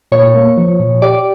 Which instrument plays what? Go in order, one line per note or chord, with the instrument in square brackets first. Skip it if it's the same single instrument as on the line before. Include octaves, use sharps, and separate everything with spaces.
[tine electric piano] A#2 [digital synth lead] C#5
[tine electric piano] A#3
F3
A#2
[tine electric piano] G4 [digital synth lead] D5